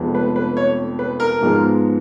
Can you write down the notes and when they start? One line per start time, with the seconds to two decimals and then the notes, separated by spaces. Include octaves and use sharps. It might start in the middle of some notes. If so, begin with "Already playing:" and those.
Already playing: F1 F2 F3 G#3 B3
0.14 B4
0.36 B4
0.57 C#5
0.99 B4
1.20 A#4
1.41 G#2 F3 G#3 B3